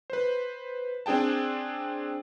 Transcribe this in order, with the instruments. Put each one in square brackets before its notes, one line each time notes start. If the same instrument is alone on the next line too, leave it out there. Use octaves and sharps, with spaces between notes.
[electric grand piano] B4 C5
C4 D4 G#4 G5 A5